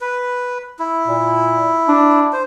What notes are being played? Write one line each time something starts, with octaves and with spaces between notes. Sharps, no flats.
B4
E4
A#2
D4
C5